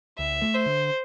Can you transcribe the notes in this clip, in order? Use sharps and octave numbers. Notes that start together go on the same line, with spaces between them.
D2 E5
A3
C5
D3